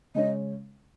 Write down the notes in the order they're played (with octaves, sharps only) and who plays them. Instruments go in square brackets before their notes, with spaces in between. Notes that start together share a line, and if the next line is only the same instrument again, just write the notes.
[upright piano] C#3 G#3 C#4 [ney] D#5